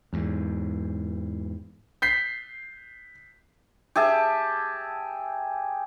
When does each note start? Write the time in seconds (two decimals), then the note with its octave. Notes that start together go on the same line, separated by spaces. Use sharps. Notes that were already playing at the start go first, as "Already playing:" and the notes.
0.13 E2 G#2
2.02 G6 B6 C7
3.96 G4 G#4 E5 A5